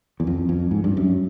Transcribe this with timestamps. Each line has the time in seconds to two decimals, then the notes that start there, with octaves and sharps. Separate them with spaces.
0.20 E2
0.27 F2
0.49 F2
0.71 G#2
0.84 G2
0.97 F#2